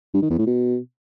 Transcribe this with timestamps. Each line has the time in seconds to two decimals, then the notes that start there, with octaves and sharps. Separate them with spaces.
0.14 G2
0.22 D#3
0.30 E2
0.39 A2
0.47 B2